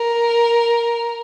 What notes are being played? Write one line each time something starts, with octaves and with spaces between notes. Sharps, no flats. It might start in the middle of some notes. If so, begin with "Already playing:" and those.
Already playing: A#4